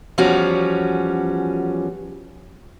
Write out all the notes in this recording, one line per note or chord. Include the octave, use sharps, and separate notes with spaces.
E2 F3 G3 C#4 F#4